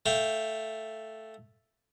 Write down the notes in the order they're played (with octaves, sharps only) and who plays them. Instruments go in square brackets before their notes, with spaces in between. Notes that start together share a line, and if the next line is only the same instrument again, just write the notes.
[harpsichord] A3 F5 G5